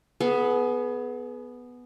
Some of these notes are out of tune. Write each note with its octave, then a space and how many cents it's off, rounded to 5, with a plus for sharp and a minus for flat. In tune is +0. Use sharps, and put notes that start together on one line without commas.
B3 +0 G#4 +35